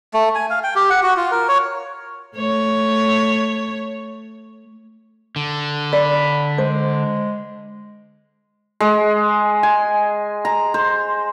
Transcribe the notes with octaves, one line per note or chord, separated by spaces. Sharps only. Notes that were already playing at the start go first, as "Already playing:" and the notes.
A3
G#5
F5
G5
G4
F#5
F#4
F4
A#4
C#5
A3 C#5
D3
D5 B5
G#3 C5
G#3
G#5
A#5
C5